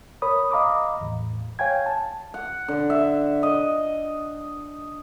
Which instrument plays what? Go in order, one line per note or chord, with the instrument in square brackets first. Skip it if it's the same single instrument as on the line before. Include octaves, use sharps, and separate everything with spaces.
[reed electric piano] A#4 C#5 B5 D#6
D#5 F5 A#5 B5 D6 D#6
E2 A2
C#5 F5 G5 G#5 G#6
A5
[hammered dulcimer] F#5
D3
E5
D#5